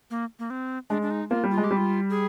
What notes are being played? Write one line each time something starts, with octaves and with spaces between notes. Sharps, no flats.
A#3
A#3
C4
G#3 D4
D4
D#4
A#3 F4
G3
F4
G#3
G4
G3
F4
G#4